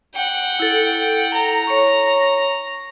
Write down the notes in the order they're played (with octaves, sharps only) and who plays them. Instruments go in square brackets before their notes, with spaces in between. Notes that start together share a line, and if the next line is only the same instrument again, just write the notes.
[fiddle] F#5 G5
[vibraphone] E4 A4
[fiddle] A#5
[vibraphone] C#5 C#6